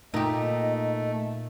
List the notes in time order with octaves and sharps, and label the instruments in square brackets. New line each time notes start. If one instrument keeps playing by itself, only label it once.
[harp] A#2 [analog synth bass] A3 [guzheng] D#4 G4 [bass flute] D#5